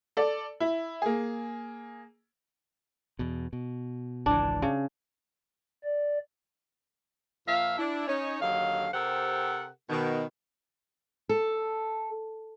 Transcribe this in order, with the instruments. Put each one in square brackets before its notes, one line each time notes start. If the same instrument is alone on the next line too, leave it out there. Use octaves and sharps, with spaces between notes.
[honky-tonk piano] A4 D5
E4
A#3 G#4
[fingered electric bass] E2 B2
B2
[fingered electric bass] G#1 C#2 E3 [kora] D4
[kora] C#3
[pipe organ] D5
[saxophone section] A#2 F3 E5 F5
D4 E4
C#4 D#4 C#5
D#2 D3 F#3 D#5 F5
C3 G4 A4 A#4 C5 F#5
B2 D#3
[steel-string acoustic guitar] A4